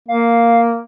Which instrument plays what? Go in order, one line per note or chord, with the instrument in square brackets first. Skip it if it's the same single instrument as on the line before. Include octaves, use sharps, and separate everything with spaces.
[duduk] A#3 [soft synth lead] F5